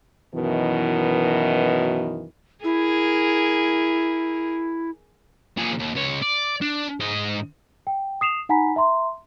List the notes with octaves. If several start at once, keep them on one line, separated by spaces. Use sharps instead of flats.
F#2 B2 D#3 E3
E4 G#4 A#4
A#2 G#4
D#2
C#2 C#5
D5
D4
G#2 D#5
G5
D#6 C7 E7 F7
D#4 F#5 G#5 A#5 B5 B6
E5 A#5 C6